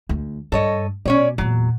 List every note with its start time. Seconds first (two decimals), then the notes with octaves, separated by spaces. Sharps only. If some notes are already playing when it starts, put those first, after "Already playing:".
0.09 D2
0.52 G2 A4 C#5 D#5
1.05 B2 C#4 C#5 D5
1.38 E2 A#2 F#3